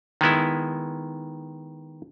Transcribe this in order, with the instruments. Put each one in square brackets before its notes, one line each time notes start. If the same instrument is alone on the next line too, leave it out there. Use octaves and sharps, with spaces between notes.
[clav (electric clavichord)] D#3 G#3 B3 E4